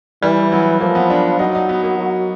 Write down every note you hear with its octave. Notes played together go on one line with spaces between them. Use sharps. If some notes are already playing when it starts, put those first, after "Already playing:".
E3 G3
F#3
F3 A#3
B3
D4
F#3 D#4
D#4
B3
A#3
F#3